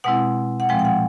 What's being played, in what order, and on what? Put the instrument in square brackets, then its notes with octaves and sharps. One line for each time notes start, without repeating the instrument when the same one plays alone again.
[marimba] B2 G#3 C4 E4 F#5
F#5
A#2 F3 G#3 C4 G5
G5
F#5